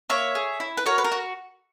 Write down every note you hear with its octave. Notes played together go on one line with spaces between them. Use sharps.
A#3 C#5 E5
G#4
E4
B4
F#4 A#4 C#5
B4
A#4
F#4